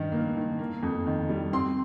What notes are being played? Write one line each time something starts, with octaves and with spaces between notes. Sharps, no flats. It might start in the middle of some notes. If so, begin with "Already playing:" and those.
Already playing: G2 D#3
A#3
D#3
A#3
F2
D#3
G3
C4 C6